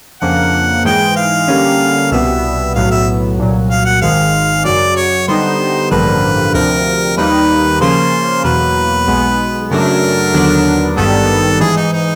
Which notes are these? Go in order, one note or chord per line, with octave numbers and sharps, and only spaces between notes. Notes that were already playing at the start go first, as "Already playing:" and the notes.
F2 C#3 F3 A#3 D4 F#5
G#2 E3 G#3 G5
F5
D3 G3 A#3 C#4
C2 B2 G3 B3 E5
B1 A2 F#3 B3 F5
E5
C2 A#2 F#3
F5
F#5
G#1 G#2 D#3 G#3 F5
F#2 C#3 F#3 D5
C#5
D3 G3 B3 D#4 C5
A1 G2 D3 F3 A#3 B4
D2 C3 F3 A#4
D#2 D#3 G3 A#3 D#4 B4
C#3 F3 A#3 C#4 F4 C5
E2 B2 F#3 A#3 B4
B1 B2 G#3 B3
F#2 C#3 F#3 A3 D4 A#4
D#2 D3 F#3 B3 D4
G#1 G2 D#3 G3 B3 A4
G#2 E3 G#3 G#4
D#4
D#4